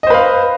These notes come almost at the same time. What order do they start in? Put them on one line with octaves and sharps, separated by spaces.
D#5 C5 B4 F5